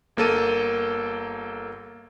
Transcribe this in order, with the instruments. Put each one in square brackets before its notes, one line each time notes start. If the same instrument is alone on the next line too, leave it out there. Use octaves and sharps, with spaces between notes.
[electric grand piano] G1 A#3 A4 D#7